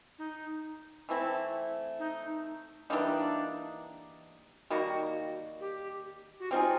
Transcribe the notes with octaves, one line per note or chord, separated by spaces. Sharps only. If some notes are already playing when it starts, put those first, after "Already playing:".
D#4
E3 A3 C4 E4
D#4
E3 G3 A#3 D4 D#4
D#3 G3 A#3 F#4
G4
F#4
G3 C4 D#4 F4 G#4